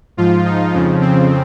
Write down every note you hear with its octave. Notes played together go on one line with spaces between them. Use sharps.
G#2 F3 F4
D#4
F2 C#3 F3
C4